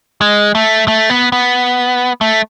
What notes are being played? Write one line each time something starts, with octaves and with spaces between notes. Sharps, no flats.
G#3
A3
A3
B3
B3
A3